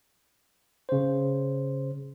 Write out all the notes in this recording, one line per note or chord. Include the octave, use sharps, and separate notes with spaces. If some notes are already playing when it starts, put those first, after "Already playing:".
C#3 C5